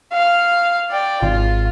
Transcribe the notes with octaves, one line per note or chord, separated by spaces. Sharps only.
F5
D5 G5
G#1 F4